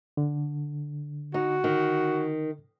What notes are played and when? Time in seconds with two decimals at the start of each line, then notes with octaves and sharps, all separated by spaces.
0.17 D3
1.34 D#4 F#4
1.64 D#3